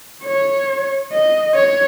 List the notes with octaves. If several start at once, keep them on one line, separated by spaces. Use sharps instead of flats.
C#5
D#5
C#5